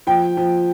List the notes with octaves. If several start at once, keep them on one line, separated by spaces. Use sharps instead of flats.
F3 G5
F3